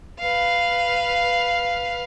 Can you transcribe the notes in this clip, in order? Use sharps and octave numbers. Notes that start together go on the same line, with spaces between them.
B4 F5